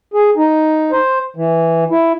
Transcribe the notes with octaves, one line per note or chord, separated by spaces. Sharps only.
G#4
D#4
C5
E3
E4